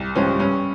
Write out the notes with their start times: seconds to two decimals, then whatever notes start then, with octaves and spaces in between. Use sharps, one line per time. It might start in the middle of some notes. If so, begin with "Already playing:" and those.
Already playing: C2
0.15 C3 F3 G#3 C#4
0.39 G2 C#4